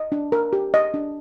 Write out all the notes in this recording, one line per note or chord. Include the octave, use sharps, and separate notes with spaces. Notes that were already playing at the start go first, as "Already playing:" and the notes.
Already playing: D#5
D4
A#4
G4
D#5
D4